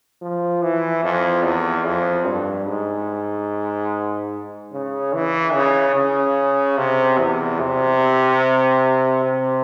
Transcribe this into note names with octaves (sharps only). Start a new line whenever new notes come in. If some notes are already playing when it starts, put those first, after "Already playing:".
F3
E3
F2
E2
F2
G2
G#2
C#3
E3
C#3
C#3
C3
E2
C3
C3